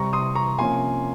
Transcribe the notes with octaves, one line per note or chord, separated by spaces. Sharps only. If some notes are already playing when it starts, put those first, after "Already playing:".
Already playing: C3 G3 C4 A#5 C#6
C6 D#6
A#5 C#6
C3 F3 A#3 C#4 G#5 C6